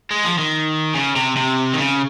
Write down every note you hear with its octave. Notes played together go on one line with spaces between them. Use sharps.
G#3
F3
D#3
C#3
C3
C3
D#3
C#3